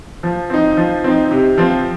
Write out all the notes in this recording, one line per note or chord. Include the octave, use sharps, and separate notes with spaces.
F3
C4 D#4
F3
C4 D#4
C3
F3 C4